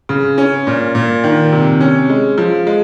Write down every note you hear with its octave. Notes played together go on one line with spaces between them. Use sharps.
C#3
C#4
A#2
A#2
D#3
C3
C#4
G#3
F3
G#3